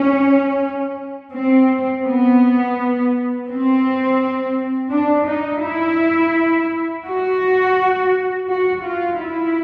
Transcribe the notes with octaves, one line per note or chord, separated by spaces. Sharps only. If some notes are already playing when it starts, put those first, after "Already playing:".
Already playing: C#4
C4
B3
C4
D4
D#4
E4
F#4
F#4
F4
E4